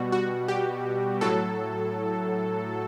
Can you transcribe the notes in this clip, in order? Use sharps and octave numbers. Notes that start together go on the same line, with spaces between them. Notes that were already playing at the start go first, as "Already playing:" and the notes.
Already playing: B2 G3 F#4
F#4
G4
A2 F#3 A4